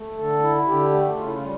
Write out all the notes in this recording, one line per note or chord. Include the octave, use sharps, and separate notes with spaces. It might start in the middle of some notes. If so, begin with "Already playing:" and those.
Already playing: A3
D3 A4
E4
D3 G4
A3
C#3 F4
E4
F4
G3